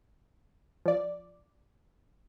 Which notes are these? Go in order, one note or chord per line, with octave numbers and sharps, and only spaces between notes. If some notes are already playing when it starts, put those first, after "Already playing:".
F3 D5